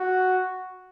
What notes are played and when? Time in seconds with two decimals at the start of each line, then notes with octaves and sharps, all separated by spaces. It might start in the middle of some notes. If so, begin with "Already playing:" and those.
Already playing: F#4